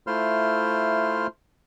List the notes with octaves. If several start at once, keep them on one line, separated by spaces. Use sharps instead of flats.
A3 E4 F4 C5 C6 F6